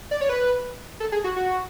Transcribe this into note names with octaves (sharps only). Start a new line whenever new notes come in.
D5
C#5
B4
A4
G#4
F#4
F#4